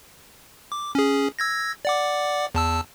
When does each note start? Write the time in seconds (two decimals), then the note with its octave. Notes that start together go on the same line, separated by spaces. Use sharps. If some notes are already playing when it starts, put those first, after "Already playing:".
0.72 D6
0.95 C#4 G#4
1.39 E6 G#6 A#6
1.85 D5 F#5 D6
2.55 E2 A5 E6